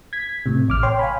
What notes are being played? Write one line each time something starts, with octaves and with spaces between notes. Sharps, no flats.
G#6 B6
A2 C3
A1 D6 F6
C#5 G5 C6
F5 G#5 B5